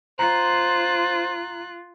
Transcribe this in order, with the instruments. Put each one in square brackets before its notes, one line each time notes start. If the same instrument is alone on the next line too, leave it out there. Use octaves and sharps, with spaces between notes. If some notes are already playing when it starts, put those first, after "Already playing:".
[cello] F4 [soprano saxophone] C5 [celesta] A#5 [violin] F#6